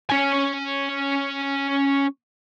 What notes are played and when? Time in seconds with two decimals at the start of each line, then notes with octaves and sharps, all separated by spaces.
0.10 C#4 G#5